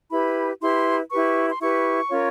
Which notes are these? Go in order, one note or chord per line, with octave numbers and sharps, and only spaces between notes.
E4 G4 B4 B5
E4 G4 B4 C6
E4 G4 B4 C#6
C6
E4 G4 B4 C#6
C#4 F4 A#4 C#5